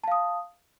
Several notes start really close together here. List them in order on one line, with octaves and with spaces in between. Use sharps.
A5 F5 D#6